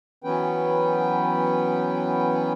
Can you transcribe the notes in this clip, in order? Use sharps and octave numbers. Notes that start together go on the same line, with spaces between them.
E3 F#3 B3 C#4 B4 G5